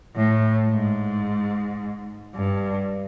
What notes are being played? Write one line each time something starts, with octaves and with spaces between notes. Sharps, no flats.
A2
G#2
G2